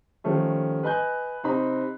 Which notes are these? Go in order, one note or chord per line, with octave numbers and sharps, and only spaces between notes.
D#3 F3 G3 A3 C#4
B4 D#5 G#5 B5 F#6 G6
C3 C4 D#4 B5